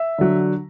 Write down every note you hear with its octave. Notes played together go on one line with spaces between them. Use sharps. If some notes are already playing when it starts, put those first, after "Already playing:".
Already playing: E5
D3 F#3